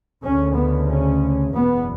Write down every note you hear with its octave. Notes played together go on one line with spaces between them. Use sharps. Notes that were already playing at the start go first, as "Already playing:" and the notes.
D2 C#3 C#4
B3
C#4
F#1 E2 B2 B3